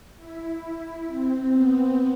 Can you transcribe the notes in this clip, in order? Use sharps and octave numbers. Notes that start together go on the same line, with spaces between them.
E4
C4
B3